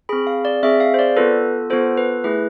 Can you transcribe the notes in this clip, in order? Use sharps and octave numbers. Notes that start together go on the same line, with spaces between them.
C4 G#4 B5
F5
D5
C4 G#4 E5
F5
C5
D5
B3 F4 A4 B4
B3 F4 A4 C5
B4
A3 E4 G#4 B4